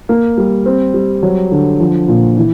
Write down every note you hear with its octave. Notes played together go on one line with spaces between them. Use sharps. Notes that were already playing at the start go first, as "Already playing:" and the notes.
A#3
G3
C4
G3
F#3
D3
F3
A#2
E3